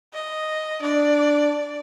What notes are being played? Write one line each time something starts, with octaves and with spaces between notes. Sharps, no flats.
D#5
D4 D5